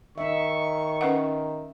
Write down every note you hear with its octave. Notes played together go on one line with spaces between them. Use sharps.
D#3 D#4 E5 C#6
C#4 B4 F#5